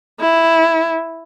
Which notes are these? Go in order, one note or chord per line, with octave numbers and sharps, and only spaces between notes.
E4